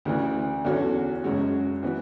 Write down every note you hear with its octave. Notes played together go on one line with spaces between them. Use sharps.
D2 C#3 E3
E2 D3 F#3 C#4 F#4
F#2 C#3 G#3 C#4 F#4
E3 B3 F#4